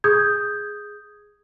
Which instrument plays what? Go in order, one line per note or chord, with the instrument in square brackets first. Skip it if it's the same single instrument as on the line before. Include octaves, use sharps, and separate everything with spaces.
[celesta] G#4 D#6 G6 G#6